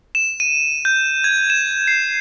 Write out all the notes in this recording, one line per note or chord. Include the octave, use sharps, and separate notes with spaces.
E7
D#7
G6
G#6
E7
C7